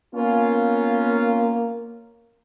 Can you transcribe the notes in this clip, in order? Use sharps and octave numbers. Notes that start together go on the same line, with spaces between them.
A#3 B3 C#4 F4